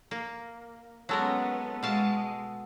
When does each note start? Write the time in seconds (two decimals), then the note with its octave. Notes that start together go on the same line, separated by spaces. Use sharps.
0.11 A#3
1.09 F#3 G#3 B3 C#4 A4 A#4 F#5
1.83 B2 G#3 F5 A5